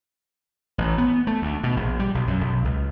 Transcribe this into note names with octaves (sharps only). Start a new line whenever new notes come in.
A1
B3
A3
D2
B2
A#1
G3
B1
F#2
B1
C#2